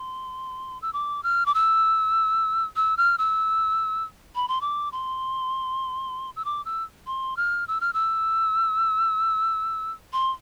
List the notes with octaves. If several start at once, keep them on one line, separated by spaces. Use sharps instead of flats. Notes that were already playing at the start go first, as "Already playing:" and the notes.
Already playing: C6
E6
D6
F6
D6
E6
E6
F6
E6
B5
C6
D6
C6
E6
D6
E6
C6
F6
E6
F6
E6
C6